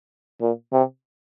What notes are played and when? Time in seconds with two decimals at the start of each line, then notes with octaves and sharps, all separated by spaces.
0.41 A#2
0.73 C3